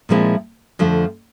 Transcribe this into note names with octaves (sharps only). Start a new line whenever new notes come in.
A#2 F3 G#3 C4 E4
F2 D3 F3 A3